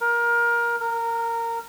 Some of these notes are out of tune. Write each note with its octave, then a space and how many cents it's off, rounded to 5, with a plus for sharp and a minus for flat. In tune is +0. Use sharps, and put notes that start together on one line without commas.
A#4 +20
A#4 -15